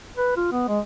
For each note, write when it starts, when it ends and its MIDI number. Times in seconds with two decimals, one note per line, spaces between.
0.17 0.34 71
0.37 0.51 65
0.52 0.63 59
0.68 0.80 56